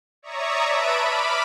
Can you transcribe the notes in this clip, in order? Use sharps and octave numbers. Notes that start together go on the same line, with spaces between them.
C#5 D5 E5 A#5 C#6 D#6
B4 E5 A5 B5 D7 D#7
B5 D6 F6